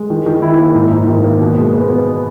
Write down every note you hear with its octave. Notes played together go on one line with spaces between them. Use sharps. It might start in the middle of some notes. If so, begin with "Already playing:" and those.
Already playing: G#3
D#3
D#3
E4
A#3
G#2
G#2
D#3
A#3
B2
G#3
B3
B3